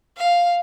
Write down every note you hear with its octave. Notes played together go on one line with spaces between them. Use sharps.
F5